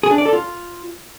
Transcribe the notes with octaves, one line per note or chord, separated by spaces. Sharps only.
G#4
D4
D5
A4
F4